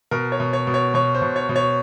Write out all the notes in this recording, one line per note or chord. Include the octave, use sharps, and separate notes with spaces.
B2 A#4
C#5
B2
C#5
B2
C#5
B2 C#5
C5
B2
C#5
B2
C#5